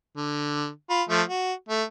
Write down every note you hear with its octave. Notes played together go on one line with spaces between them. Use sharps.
D3
F4 B5
F3 A3
F#4
A3